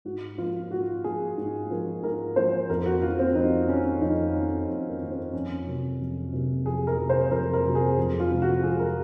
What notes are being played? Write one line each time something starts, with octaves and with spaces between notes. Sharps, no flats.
G#2 F#4
F3 A#3 F4
G#2 F#4
F3 A#3 G#4
G#2
F3 A#3
G#2 A#4
F3 A#3 C5
F2 A#4
F#4
D#3 A#3 F4
C4
F2 D#4
D#3 A#3 C#4
F2 D#4
D#3 A#3 C#4
F2
A#3
D#3 A#3
C4
F2 C#4
C3 F#3 A#3
F2
C3 F#3 A#3
F2 G#4
A#4
C3 F#3 A#3
C5
F2 A#4
A#4
C3 F#3 A#3
G#4
F2
F4
C3 F3 G#3
F#4
F2 G#4
A#4